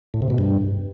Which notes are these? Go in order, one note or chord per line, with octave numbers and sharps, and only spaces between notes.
A2
C3
B2
G2